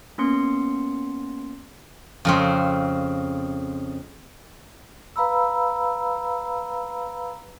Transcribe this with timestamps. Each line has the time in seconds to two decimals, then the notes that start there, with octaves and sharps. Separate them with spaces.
0.18 A#3 B3 C#4 C6 C#7
2.25 F2 C#3 C4
5.16 B4 F5 A#5 B5 E6